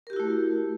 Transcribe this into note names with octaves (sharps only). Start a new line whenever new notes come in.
A3 E4 F#4 G4 A#4